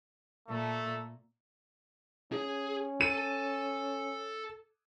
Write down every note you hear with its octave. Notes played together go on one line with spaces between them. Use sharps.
A#2 A3
C#4 G#4
A4 A5 D#7